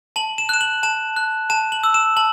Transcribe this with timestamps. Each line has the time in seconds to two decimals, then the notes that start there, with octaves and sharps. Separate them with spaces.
0.16 A5 F#7
0.38 E7
0.49 F#6 E7
0.61 F#7
0.83 A5 E7
1.16 F#6
1.50 A5 E7
1.72 F#7
1.83 E6
1.94 E7
2.17 A5 F#7